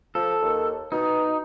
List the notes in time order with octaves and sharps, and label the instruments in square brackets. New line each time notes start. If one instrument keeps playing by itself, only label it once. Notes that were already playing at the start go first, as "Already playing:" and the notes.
[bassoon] F3 [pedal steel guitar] A4
[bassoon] D#2
[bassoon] B2 [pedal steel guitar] D#4